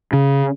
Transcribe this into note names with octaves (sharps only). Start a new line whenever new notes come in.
C#3